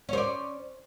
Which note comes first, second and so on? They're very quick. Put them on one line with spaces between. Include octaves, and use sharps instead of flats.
C#4 C5 D5